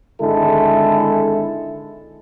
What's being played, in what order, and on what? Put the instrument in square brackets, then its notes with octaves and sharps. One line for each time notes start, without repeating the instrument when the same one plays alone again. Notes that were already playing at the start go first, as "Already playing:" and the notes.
[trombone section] G#1 D3 G#3 E4 A4